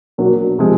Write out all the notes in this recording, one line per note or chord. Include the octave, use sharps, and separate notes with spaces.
B2 F#3 A#3 D4
C3 F3 G#3 C4